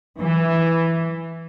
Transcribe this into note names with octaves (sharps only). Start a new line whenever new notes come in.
E3